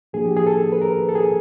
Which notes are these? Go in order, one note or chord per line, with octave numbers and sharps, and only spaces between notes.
A2 F3 A#3 D4 G#4
G4
G#4
A4
B4
A#4
A4
G#4